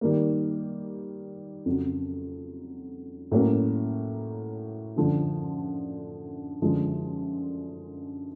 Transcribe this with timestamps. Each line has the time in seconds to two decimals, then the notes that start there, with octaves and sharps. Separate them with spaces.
0.01 D#3 G3 A#3
1.66 F2 C#3 F#3
3.31 A2 F#3 A#3 C#4
4.96 F#2 D3 F3
6.62 F#2 D3 F3 G#3